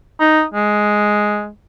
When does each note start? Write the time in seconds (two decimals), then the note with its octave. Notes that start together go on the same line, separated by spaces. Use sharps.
0.20 D#4
0.54 G#3